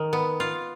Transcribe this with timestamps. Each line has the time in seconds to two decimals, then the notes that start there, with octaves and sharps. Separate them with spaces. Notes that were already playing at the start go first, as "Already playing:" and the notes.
Already playing: D#3
0.13 B3
0.40 F4